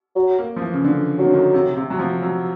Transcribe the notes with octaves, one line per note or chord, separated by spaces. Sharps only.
F#3
A#3
F3
E3
C#3
D3
D#3 F#3
D3
D#3
C3
C3
F#3
F3
F#3